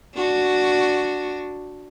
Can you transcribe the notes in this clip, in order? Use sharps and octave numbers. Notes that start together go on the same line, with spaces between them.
D4 F#4